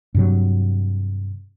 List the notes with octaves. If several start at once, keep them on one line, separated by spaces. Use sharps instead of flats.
G2 C3 F#3